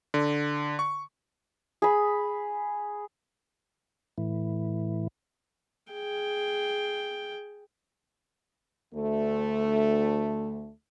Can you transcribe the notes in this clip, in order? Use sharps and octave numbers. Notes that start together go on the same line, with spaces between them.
D3
C#6
G#4 B5
A2 E3
G#4 G5
D2 A3